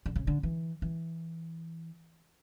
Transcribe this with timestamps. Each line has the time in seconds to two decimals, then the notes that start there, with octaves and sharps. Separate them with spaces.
0.06 D3
0.16 C#3
0.27 D3
0.43 E3
0.82 E3